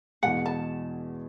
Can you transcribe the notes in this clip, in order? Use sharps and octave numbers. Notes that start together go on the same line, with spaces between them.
E2 B2 G#3 F#5
A5